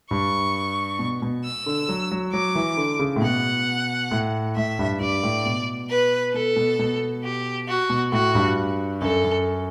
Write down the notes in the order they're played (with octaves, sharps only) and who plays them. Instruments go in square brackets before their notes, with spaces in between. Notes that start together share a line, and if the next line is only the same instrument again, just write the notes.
[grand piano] G2 [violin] C#6
[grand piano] B2
B2
[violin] E6
[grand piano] D3
F#3
F#3
[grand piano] F#3 [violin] D6
[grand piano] E3
D3
C#3
A2
[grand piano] B2 [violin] F#5
[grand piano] A2
[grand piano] A2 [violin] E5
[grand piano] G2
[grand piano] G2 [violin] D5
[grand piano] A2
B2
[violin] B4
[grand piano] B2 [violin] A4
[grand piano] B2
B2
[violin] G4
F#4
[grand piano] B2
[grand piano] A2 [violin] F#4
[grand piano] G2
[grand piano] F#2 [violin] A4
[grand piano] F#2